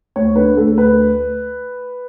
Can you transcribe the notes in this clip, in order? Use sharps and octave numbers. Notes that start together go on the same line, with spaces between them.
D2 C#5
D3 B4
D2 A4
D2 B4